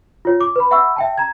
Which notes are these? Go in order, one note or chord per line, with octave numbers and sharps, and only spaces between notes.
F4 C#5
D6
B4 B5
E5 F#5 B5 C#6 E6
E5 G5 A5
A#5 G#6